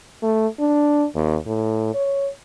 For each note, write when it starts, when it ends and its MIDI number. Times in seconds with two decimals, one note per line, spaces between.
0.22 0.47 57
0.59 1.05 62
1.15 1.36 39
1.46 1.89 45
1.95 2.29 73